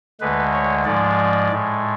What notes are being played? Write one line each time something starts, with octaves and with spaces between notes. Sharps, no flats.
D2 D3 G#3 B4
C#5
G#2 F3 G#3 D5
A2 G#3